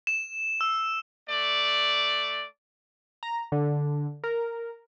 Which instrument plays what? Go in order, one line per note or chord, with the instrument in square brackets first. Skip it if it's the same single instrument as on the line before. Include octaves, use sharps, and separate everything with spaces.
[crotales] E7
E6
[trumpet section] A3 D5
[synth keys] A#5
D3
A#4